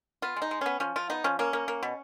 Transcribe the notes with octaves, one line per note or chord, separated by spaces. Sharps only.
B3 F4
G#3
D#4
G#3
B3 C#4
F3 C#4
F3 F4
B3 D#4
F3 C#4
A#3 C#4
A#3
A#3
B2